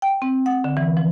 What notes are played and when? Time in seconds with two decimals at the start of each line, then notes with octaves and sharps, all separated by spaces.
0.02 G5
0.22 C4
0.46 F#5
0.64 D3
0.77 E3
0.97 F3